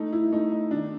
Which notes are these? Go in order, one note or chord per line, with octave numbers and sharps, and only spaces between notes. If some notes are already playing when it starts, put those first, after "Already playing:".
Already playing: A3 D#4
E4
A3 D#4
D#4
D#3 D4